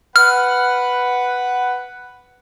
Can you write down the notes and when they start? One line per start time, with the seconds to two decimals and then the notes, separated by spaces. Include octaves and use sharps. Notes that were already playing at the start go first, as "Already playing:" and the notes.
0.16 B4 F#5 F6